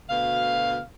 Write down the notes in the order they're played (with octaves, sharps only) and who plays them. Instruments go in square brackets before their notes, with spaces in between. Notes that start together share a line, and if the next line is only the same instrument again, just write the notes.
[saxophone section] D2 B2 F5